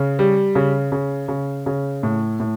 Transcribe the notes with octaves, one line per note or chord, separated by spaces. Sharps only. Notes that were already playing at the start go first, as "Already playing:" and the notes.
Already playing: C#3
G3
C#3
C#3
C#3
C#3
A2
A2